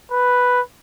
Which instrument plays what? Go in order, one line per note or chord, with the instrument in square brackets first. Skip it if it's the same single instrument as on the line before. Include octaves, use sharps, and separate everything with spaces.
[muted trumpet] B4